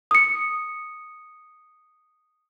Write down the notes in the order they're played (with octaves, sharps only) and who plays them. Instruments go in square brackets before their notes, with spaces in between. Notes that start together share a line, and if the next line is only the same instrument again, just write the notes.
[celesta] D#6 C#7